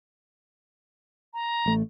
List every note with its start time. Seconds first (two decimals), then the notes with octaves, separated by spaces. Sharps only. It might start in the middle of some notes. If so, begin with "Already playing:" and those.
1.34 A#5
1.66 A1 A3